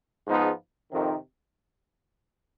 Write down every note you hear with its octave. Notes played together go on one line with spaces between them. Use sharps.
G#2 F3 G#3 B3 D#4
F2 C3 D#3